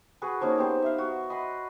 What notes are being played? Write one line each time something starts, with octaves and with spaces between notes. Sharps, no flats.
F#4 G#4 B4
F3 A#3 C#4 D#4
B3 G4 C5
E5 F5
F#4
D#5 B5 C6 D#6